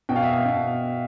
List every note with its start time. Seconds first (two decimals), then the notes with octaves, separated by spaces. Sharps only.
0.09 B2 G5
0.16 F5
0.24 E5
0.31 F5
0.46 B2